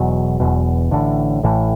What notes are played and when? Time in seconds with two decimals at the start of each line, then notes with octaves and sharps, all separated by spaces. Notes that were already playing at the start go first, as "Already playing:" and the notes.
Already playing: E1 E2 B2 F#3
0.40 E1 E2 B2
0.91 A1 A2 D3
1.43 A1 A2 E3